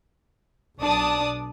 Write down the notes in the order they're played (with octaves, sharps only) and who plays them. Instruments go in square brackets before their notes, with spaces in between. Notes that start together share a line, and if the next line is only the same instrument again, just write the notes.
[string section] B1 D4 D5 A5 D#6